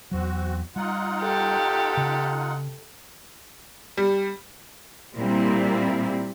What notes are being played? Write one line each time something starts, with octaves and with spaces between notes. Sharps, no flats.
E2 F#3 C4 F#4
G3 D#4 F4 F#5
G4 A4
C#3
G3
A#2 G3 A#3 C4 E4